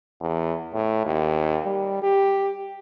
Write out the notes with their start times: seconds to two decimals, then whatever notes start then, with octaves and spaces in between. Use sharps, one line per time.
0.21 E2
0.74 A2
1.06 D#2
1.66 G3
2.02 G4